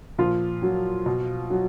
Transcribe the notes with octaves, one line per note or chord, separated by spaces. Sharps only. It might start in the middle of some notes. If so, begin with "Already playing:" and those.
A#2 F3 F4
F#3
B2
F#3